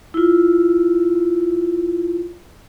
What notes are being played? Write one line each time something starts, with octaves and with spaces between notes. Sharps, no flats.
E4 F4